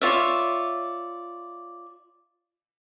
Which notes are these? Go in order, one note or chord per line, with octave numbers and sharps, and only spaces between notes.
F4 C#5 D5 E5